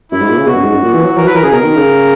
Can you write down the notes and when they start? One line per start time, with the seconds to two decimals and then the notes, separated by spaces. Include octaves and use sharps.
0.11 F#2 E4
0.20 G#2
0.29 A#2
0.38 C#3
0.47 B2 F#4
0.55 F#2
0.64 G#2
0.74 F#2
0.82 A#2
0.94 E3
1.05 F#3
1.16 E3 A#4
1.26 F#3 B4
1.35 E3 A#4
1.43 C#3 G#4
1.52 B2 A#4
1.63 D#3
1.76 C#3